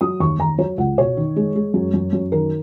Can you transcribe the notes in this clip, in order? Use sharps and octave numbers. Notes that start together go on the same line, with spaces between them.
F#3 D#6
D#2 C#6
D#2 A#5
F#3 C#5
C#2 F#5
B2 C#5
D#3
G#3
G#3
F#2
F#2
F#2
D#3 A#4